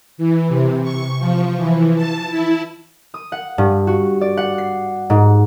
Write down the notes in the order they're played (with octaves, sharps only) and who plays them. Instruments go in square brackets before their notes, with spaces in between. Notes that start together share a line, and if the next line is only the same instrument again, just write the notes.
[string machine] E3
C3
C#6
F3
E3
A5
E4
[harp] D#6
F#5
G2
F#4
D5
F#5
C7
G#2